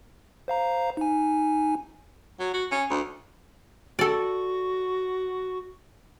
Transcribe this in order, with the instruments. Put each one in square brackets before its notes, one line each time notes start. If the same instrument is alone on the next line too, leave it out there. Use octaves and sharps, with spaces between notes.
[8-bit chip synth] C5 F5 A#5
D#4 G#5
[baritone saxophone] F#3
F#4
C#4
D2
[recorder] F#4 [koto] A4 D5